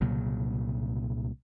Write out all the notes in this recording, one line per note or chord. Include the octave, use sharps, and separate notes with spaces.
C2 A#2 C#3 F#3